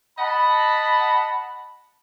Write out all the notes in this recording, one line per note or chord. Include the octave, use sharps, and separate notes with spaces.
D#5 F#5 A5 B5